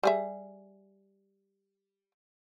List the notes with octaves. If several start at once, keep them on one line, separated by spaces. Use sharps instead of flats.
G3 G#4 E5